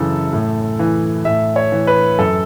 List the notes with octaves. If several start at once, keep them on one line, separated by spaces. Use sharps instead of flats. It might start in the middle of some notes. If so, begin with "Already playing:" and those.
Already playing: F#2 C#3 E3 A4
A2
E3
A2 E5
C#5
E3
B4
F#2 A4